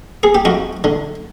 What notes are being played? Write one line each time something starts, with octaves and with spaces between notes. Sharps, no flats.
G#4
G4
F2 F#4
D3